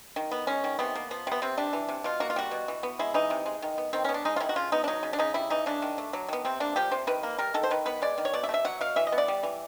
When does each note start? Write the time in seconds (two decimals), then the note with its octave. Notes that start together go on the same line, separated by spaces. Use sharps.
0.16 D#3
0.31 B3
0.47 G#3 C#4
0.64 D#3
0.79 C3 B3
0.95 A#3
1.11 F3 B3
1.27 C3 B3
1.42 C3 C4
1.57 G3 D4
1.73 E3
1.89 C3
2.04 B2 F4
2.20 A#3 F#4
2.30 F4
2.36 G3 F#4
2.51 B2
2.68 E3
2.83 B3
2.99 G#3 E4
3.14 E3 D#4
3.30 C3
3.46 G#3
3.62 D#3
3.78 B3
3.93 D#3 C4
4.04 B3 C#4
4.14 D4
4.25 G#3 D#4
4.36 F4
4.40 D#3 E4
4.49 F#4
4.56 C#3 F4
4.72 B3 D#4
4.84 D4
4.88 F#3 D#4
5.03 C#3
5.13 D4
5.19 C#3 D#4
5.34 G3 E4
5.50 E3 D#4
5.66 C#3 D4
5.82 D#3
5.98 A3
6.13 F#3
6.28 D#3 B3
6.45 C3 C4
6.60 A#3 D4
6.76 F3 G4
6.92 C3 C5
7.07 D#3 B4
7.23 A#3
7.38 G3 A#4
7.54 D#3 A4
7.63 C5
7.71 D#3 B4
7.86 B3 B4
8.02 G#3 D5
8.18 D#3
8.25 C#5
8.34 B2 D5
8.43 E5
8.49 A3
8.54 E5
8.65 F#3 F#5
8.81 B2 F5
8.96 E3 E5
9.07 D#5
9.12 B3
9.18 D5
9.28 G3
9.43 E3